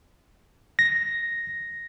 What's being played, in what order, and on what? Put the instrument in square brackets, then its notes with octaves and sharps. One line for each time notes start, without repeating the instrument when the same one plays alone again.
[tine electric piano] A#6